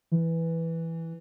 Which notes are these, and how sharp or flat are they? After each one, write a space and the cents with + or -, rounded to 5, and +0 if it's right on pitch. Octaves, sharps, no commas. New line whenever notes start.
E3 +0